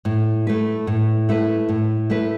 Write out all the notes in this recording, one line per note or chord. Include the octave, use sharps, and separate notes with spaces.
A2
A3 E4 B4
A2
A3 E4 B4
A2
A3 E4 B4